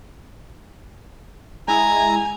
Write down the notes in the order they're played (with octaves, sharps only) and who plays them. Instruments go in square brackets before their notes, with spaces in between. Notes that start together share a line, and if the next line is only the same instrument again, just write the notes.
[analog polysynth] G#3 E4 [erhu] G#5 [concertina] A#5